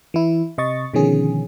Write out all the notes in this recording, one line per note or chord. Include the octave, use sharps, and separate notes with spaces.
E3 E4
C3 D#5 C#6 A6
B2 D3 D#3 F3 C#4 G#4